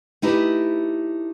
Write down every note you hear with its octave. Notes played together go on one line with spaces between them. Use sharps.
A3 D#4 E4 G4 B4